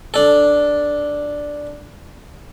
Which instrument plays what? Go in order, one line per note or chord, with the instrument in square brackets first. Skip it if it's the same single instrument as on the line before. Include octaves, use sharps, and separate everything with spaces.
[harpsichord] D4 A4